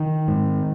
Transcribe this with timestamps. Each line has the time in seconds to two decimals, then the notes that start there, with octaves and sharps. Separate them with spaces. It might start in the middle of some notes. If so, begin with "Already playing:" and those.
Already playing: D#3
0.28 G#2